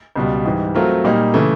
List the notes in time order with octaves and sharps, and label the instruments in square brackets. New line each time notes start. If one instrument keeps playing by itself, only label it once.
[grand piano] C#2 B2 G3
G#2 E3 G3
F#3 A3 C4 F4 A#4
A#2 G3 A#3 D#4
C#3 E3 A3